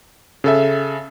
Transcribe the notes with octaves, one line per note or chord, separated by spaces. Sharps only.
C#3 A4 E5